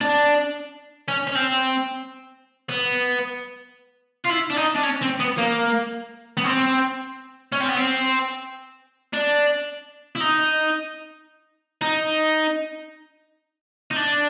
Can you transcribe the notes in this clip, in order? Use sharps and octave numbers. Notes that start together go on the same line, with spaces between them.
D4
C#4
C#4
C4
B3
F4
E4
D4
D#4
D4
C#4
C4
B3
A#3
B3
C4
C#4
C4
B3
C4
D4
E4
D#4
D#4
D#4
D4